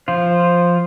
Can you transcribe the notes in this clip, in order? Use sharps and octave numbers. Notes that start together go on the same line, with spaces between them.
F3 F4 C5